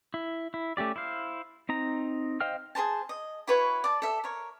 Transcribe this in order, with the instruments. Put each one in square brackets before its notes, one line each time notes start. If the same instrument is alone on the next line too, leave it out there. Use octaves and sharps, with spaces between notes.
[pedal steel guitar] E4
E4
A3 C#4 G4 D5
E4 C5 F5
C4 D#4 A#5
C5 D#5 F5 G5 F6
[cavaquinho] G#4 A#4 C5 A5
D#5
E4 F#4 B4 C#5
D5 A5
A4 E5
A#4 C#5